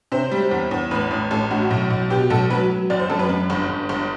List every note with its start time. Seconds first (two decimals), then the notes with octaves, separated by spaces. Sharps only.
0.12 C3 C5
0.31 G3
0.51 E2
0.71 E2
0.91 A1 B4
1.11 A1
1.31 A1 A4
1.51 A2 F#4
1.71 B1
1.90 B1
2.10 B2 G4
2.30 B1 A4
2.50 F#3 B4
2.70 F#3
2.90 F#1 D5
3.00 C5
3.10 F#2 A4
3.19 B4
3.29 F#2
3.50 G1
3.69 G1
3.89 G1